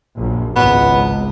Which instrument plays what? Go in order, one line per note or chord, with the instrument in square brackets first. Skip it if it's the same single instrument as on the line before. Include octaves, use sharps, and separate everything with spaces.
[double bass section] A#1 F#2
[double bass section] G#1 C#2 G#2 [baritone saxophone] B3